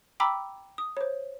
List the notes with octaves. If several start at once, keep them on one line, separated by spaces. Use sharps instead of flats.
G5 A#5 B5 D6 E6 B6
D#6
C5 C#5